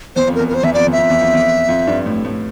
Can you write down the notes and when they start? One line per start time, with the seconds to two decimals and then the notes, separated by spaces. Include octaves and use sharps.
0.16 E2 C5
0.27 F2
0.35 A#4
0.39 E2
0.48 A#4
0.51 F2 C5
0.63 E2 E5
0.73 F2 D5
0.87 E2
0.92 E5
0.97 F2
1.10 E2
1.21 F2
1.33 E2
1.68 F2
1.87 G2
2.06 A2
2.25 A2